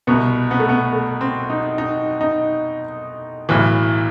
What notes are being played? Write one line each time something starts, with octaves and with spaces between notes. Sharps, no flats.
C2 B2 B3
B3
A3
B3
A3
C4
D#4
D#4
D#4
B1 A2 E3